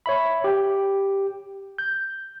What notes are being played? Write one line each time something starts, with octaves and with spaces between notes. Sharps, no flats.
C#5 E5 B5
G4 G5
G6